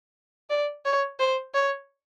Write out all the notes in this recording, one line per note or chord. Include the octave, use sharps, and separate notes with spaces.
D5
C#5
C5
C#5